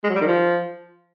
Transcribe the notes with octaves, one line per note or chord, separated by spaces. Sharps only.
G#3
F#3
G3
D#3
F3